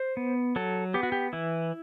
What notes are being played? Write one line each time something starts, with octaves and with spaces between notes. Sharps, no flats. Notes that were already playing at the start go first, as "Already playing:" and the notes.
Already playing: C5
B3
F#3 A4
B3 G4
F#4
G4
E3 E4